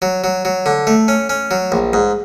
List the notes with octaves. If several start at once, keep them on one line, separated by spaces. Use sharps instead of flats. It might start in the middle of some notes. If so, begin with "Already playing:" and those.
F#3
F#3
F#3
D3
A3
C#4
C#4
F#3
A#1
G#2